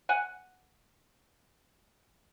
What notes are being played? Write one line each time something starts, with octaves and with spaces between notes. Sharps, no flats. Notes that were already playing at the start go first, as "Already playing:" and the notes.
F#5 G#5